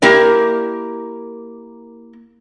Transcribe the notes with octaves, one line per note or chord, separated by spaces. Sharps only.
A#3 E4 G4 A#4 D5